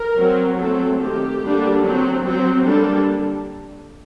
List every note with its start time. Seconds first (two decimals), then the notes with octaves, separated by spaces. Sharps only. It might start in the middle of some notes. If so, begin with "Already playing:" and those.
Already playing: A#4
0.17 F#3 C4
0.58 F#3 A3 C4 A4
1.00 D#3 A3 C4 G4
1.42 D3 G3 A#3 D4
1.84 F#3 C4
2.25 F#3 C4
2.66 D3 G3 A#3 D4 A4